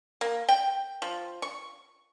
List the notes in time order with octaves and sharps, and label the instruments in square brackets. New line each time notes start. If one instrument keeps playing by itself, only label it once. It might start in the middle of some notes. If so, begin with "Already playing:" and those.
[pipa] A#3
G5
F3
C#6